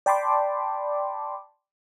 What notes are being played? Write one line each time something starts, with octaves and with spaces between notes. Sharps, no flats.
D5 G5 A5 B5 C6 D6